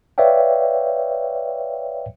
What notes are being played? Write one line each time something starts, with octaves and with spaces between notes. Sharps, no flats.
B4 C#5 D5 E5 F5 G5